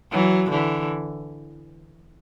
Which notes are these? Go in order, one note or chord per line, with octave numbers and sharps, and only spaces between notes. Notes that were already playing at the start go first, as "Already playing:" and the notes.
E3 F#3
D3 E3